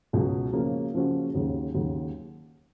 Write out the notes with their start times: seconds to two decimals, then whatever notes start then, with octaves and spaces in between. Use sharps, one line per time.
0.13 C#2 B2 F#3
0.53 C#3 F3 A#3 C#4 F#4
0.94 C#3 F3 A#3 C#4 F#4
1.34 D#2 C#3 F#3
1.75 D#2 C#3 F#3